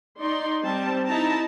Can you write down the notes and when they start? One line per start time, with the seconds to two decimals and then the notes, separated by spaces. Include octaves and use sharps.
0.19 D#4 D5 C6
0.63 G3 C4 A5
1.08 D#4 E4 A5 A#5